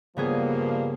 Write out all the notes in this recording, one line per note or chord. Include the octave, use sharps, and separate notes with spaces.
G2 C#3 F3 G3 A#3 B3 G#4